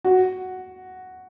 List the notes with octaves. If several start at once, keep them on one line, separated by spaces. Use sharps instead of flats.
F#4